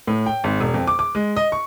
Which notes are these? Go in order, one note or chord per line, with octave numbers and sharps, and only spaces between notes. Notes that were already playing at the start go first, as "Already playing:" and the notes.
A2
G5
G#1
E1
F2
D6
D6
G#3
D#5
C#6